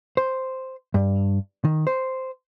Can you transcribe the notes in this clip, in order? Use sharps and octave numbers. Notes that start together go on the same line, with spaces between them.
C5
G2
D#3
C5